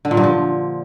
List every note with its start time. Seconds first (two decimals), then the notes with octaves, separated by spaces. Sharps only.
0.05 D3
0.11 A#2
0.17 G2
0.23 F3